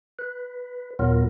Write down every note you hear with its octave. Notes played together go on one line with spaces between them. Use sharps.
B4
D#2 A#2 F#3 B3 F4 A#4